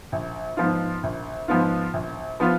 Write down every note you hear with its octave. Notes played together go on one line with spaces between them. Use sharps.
A#1
G#2 F3 B3 F4
A#1
G#2 F3 B3 F4
A#1
F3 B3 F4